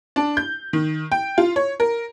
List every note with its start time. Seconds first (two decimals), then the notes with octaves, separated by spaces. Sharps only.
0.16 D4
0.37 G6
0.73 D#3
1.12 G5
1.38 F4
1.56 C#5
1.80 A#4